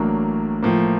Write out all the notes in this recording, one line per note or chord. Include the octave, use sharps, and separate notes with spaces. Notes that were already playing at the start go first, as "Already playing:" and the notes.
Already playing: A1 A2 F#3 A#3 D4
A2 F3 A#3